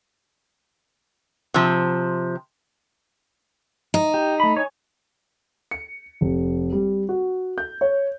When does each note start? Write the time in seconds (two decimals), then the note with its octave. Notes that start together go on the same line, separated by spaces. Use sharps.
1.54 C3 F3
3.94 D#4
4.14 G4
4.40 A3 B5
4.57 C#5 G#5
5.71 C#7
6.21 F1
6.72 G3
7.09 F#4
7.58 G6
7.81 C#5